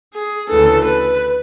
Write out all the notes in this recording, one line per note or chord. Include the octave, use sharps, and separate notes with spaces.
G#4
D2 C#3 E3 A4
B4